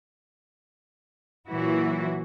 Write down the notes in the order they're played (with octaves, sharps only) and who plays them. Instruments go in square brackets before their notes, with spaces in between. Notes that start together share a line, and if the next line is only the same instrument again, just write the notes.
[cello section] A#2 E3 F#3 E4 F#4